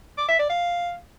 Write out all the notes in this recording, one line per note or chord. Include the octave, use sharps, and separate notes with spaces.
D6
E5
D5
F5